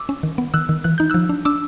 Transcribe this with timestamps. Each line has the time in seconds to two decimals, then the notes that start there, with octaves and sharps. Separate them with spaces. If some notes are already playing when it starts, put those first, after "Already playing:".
Already playing: D6 E6
0.09 C#4
0.23 D#3
0.38 B3
0.54 D#3 E6 F#6
0.69 D#3
0.84 E3 F#6
0.98 D#4 G6
1.10 F3 E6 F#6
1.29 D4
1.45 D4 D6 E6